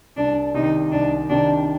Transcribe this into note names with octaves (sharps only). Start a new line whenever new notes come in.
C2 D4
C3 D#3 D#4
C2 D4
C3 D#3 D4